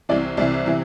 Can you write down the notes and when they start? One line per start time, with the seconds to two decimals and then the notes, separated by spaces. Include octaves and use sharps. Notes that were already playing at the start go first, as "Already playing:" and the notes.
0.09 C2 C3 E3 D5
0.37 C2 C3 E3 D5
0.66 C3 E3